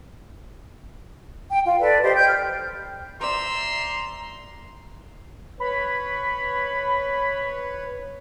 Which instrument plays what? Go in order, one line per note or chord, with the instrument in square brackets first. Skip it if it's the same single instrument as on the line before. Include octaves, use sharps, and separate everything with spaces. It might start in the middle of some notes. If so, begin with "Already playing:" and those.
[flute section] G5
F4
A4 B4 D5
G4 C5 D5 D#5
G5 G6
F6
[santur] C5 D5 [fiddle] E5 E6 [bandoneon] A#5 [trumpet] C6
[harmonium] B4 C#5 [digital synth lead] B5